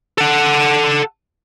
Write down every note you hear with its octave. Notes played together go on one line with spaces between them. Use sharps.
A4 F#5